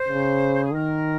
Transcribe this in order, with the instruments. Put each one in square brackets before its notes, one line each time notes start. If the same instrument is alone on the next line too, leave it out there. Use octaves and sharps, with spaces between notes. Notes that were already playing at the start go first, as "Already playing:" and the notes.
Already playing: [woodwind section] C5
[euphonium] C#3
[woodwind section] G#4
[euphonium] D#3 [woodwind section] A#4